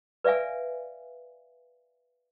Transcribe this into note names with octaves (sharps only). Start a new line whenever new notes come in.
B4 D5 E5 F5 G#5